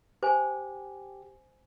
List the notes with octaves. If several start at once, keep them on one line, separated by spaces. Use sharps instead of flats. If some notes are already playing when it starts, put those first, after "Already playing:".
G4 C5 G#5